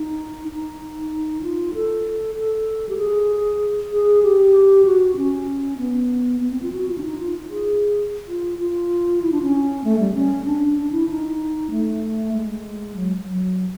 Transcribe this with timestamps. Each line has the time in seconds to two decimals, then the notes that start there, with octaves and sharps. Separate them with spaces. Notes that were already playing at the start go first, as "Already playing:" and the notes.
Already playing: D#4
0.48 D#4
1.43 F4
1.74 A4
2.36 A4
2.89 G4
2.98 G#4
3.92 G#4
4.23 G4
4.85 F#4
5.17 C#4
5.78 B3
6.41 B3
6.51 C4
6.62 F4
6.72 F#4
6.88 F4
6.98 D4
7.04 D#4
7.19 F4
7.49 G#4
8.28 F4
8.59 F4
9.22 E4
9.32 D4
9.42 C#4
9.84 A3
9.99 G3
10.14 C#4
10.45 D4
10.78 D4
10.92 E4
11.09 D#4
11.71 A3
12.34 G#3
12.96 F#3
13.27 F#3